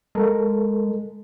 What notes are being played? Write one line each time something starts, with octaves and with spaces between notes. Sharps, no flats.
G#3 A4 A#4